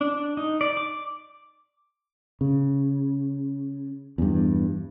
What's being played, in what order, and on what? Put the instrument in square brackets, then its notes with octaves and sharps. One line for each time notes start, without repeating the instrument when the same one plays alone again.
[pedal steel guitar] D4
D#4
D5
D6
[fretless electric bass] C#3
E2 G2